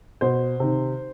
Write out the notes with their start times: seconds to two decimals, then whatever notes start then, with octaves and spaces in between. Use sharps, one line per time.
0.21 B2 C5
0.60 C3 D#3